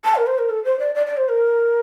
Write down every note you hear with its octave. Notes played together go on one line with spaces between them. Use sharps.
A5
A#4
C5
A#4
A4
C5
D5
D5
D5
C5
A#4